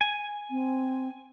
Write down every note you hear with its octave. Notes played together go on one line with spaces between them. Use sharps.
G#5
C4